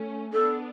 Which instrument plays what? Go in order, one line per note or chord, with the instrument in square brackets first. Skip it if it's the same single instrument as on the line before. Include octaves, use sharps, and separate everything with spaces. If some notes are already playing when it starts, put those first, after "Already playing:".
Already playing: [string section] A3 C#4
[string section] B3 D4 [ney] A4